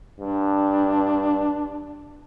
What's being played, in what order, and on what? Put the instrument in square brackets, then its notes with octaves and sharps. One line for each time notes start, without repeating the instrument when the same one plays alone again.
[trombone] G2 [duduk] D4